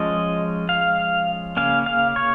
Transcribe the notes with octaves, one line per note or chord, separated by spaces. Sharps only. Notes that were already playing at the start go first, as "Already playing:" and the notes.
Already playing: F3 G#3 C#4 D#5
F5
C#3 A#3 C#4 F5
F5
C#5